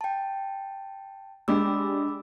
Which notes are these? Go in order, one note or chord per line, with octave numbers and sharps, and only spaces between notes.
G5 A5
G#3 D4 G4 B5 D6 E6